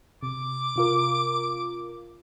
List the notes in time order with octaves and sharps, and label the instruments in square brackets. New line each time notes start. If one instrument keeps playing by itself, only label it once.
[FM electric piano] C3 [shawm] D6
[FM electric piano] C3 F4 A#4